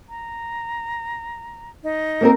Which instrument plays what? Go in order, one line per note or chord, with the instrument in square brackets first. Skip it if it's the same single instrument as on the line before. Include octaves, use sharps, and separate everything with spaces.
[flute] A#5
D#4
[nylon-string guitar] A#3 C4 A#4